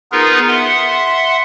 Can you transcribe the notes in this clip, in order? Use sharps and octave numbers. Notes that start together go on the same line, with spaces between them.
B3 D#4 F4 G#4 A#4 B4
E5 F#5 C6